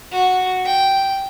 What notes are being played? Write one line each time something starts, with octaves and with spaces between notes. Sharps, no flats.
F#4
G5